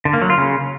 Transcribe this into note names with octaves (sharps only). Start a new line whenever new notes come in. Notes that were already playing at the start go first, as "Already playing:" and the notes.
D3
A#3
F#3
F4
C#3